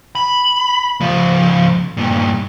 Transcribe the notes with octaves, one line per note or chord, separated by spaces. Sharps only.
B5
C#2 F3
G2 A#2